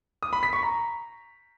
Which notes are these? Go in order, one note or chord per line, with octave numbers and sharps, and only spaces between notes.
D#6
B5
B6
C#6
A#5